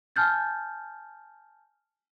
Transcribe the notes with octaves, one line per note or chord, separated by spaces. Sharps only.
G#5 A5 F6 G6 A6